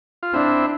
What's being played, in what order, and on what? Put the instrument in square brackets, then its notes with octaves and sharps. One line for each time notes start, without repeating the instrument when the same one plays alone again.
[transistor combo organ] F4
[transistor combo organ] C4 E4 [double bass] D4